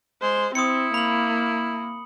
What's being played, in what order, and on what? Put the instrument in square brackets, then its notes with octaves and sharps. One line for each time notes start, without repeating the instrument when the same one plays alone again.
[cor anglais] G#3 [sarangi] C5
[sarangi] C4 [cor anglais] E4 [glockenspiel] D#6 C#7
[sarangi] A#3 [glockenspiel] B5 F#7